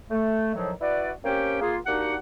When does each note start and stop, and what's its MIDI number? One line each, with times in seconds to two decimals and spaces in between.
0.11 0.54 57
0.55 0.73 45
0.55 0.73 51
0.55 0.73 53
0.55 0.73 54
0.81 1.12 64
0.81 1.12 66
0.81 1.12 71
0.81 1.12 74
1.24 1.61 58
1.24 1.61 60
1.24 1.61 61
1.24 1.61 67
1.24 1.61 73
1.24 1.61 79
1.61 1.77 58
1.61 1.77 65
1.61 1.77 68
1.86 2.17 58
1.86 2.17 62
1.86 2.17 63
1.86 2.17 66
1.86 2.17 67
1.86 2.17 78